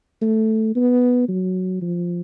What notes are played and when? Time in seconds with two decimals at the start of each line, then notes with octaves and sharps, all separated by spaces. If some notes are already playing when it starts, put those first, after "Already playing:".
0.22 A3
0.75 B3
1.29 F#3
1.82 F3